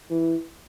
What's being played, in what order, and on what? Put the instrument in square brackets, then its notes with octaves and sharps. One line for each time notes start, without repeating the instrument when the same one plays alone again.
[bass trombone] E3